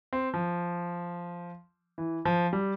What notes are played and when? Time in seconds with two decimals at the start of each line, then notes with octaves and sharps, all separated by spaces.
0.13 C4
0.34 F3
1.98 E3
2.25 F3
2.53 G3